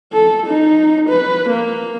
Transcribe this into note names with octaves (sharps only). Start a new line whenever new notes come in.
A4
D#4
B4
A#3